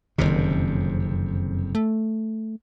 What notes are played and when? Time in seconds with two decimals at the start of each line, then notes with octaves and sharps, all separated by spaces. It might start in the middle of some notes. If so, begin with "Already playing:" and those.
0.18 F#1 F2 C3 D#3
1.75 A3